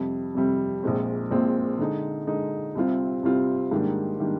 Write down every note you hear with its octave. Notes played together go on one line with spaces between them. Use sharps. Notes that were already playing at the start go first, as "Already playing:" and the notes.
Already playing: F2 C3 G3
F2 C3 G3
A#1 A#2 G#3 C4
A#1 A#2 G#3 C4
D3 G#3 D#4
D3 G#3 D#4
C2 C3 G3 C4 F4
C2 C3 G3 C4 F4
G#2 D#3 G3 A#3 D4
D#3 G3 A#3 D4